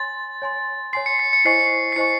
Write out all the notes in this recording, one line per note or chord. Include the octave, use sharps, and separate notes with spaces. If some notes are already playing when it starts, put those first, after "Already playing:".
Already playing: C#5 G#5 C6 A6
C#5 G#5 C6
C#5 G#5 C6 C7
C#7
C7
C#7
E4 C5 D#5 G#5 C#6 C7
C7
E4 C5 D#5 G#5 C#6 C#7